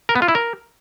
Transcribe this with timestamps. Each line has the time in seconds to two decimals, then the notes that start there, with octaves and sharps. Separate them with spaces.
0.09 A#4
0.16 B3
0.22 F4
0.28 E4
0.35 A#4